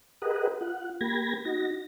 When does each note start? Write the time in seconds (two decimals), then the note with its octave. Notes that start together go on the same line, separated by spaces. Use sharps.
0.22 G4 G#4 A#4 B4 D#5 F#5
0.61 F4 F#5
1.01 A#3 G4 B5 G#6 A#6
1.45 D#4 F#4 A#6